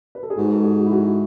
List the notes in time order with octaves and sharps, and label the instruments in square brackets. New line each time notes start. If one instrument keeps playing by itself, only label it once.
[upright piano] B4
A4
G#4
[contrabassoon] G#2 [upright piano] F#4
[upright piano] A4
G#4
F#4
E4
F#4